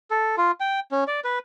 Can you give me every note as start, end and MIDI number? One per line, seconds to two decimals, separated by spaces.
0.11 0.36 69
0.38 0.51 65
0.60 0.80 79
0.92 1.04 61
1.08 1.20 74
1.24 1.39 71